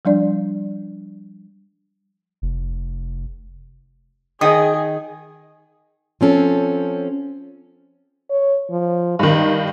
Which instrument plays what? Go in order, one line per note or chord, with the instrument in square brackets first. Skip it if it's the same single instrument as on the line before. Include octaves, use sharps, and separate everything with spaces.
[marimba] F3 G3 D4 D5
[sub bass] F1
[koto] D#3 [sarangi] G#4 [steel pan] D#5 G5 D#6
[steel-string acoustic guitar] F3 C4 C#4 A4
[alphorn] C#5
F3
[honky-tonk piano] G2 D#3 [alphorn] D#4